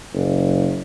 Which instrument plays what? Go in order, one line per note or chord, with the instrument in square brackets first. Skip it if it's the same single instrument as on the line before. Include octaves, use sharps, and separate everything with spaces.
[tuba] F#1